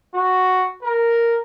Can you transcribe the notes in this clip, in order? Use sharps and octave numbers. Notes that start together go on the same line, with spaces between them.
F#4
A#4